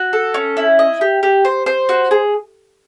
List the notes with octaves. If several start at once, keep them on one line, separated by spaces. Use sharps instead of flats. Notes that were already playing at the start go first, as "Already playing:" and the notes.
Already playing: F#4
A4
C#4
E4
D#5
G4
G4
C5
C5
F#4
G#4